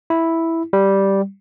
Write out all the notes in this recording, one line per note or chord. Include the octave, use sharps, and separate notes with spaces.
E4
G3